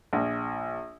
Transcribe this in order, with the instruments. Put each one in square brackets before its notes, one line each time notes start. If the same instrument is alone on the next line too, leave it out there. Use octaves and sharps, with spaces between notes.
[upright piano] A#1